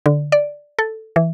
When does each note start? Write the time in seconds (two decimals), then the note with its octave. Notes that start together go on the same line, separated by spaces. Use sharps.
0.06 D3
0.32 D5
0.79 A4
1.16 E3